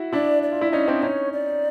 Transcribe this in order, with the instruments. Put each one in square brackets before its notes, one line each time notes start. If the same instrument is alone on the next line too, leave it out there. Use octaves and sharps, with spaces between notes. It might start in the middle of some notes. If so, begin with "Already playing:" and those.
Already playing: [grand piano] E4 F#4
[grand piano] D4 E4 [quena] D5
[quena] D5
[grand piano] F4
E4
[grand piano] C#4 D#4 [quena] D5
[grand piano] C4 D4 [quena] D#5
[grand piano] C#4 D#4 [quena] C#5
[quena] D5